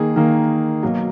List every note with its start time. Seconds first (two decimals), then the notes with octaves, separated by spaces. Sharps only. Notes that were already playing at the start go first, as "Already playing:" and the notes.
Already playing: D#3 A#3 G#4
0.16 D#3 A#3
0.83 B2 F#3 A#3